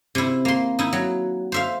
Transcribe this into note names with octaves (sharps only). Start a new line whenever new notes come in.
C3 E4
A#3 C6
D#4 E4
F#3
C5 E5 F5